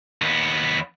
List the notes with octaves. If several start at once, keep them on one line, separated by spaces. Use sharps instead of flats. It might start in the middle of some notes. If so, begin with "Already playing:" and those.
D#2 B3